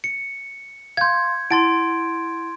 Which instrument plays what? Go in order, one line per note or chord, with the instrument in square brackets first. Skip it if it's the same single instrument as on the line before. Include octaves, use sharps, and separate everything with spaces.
[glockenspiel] C#7
[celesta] F5 C6 [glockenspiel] G6 G#6
[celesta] E4 F#5 A5 [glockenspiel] C6 A6 D7